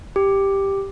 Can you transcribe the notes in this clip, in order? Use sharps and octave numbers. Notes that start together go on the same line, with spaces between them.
G4